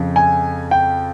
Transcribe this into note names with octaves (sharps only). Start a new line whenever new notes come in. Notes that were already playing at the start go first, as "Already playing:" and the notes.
Already playing: F2 C#3 F3
G#5
G5